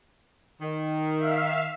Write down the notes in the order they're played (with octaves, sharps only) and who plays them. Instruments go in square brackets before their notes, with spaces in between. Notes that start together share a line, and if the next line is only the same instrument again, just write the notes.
[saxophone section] D#3
[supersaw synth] E5 F5